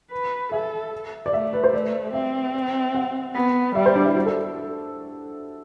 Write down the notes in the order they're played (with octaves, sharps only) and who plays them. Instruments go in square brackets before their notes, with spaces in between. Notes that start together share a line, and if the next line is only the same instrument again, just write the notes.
[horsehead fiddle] B4
[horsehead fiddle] A4 [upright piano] E5
[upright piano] D5
[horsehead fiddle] A3 [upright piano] E5
[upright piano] B4
C5
[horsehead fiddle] A3 [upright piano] D5
[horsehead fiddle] C4 [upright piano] E5
[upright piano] F#5
[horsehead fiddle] B3
[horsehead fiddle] G3 [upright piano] E5
[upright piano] C5
D4
E4
F#4
A4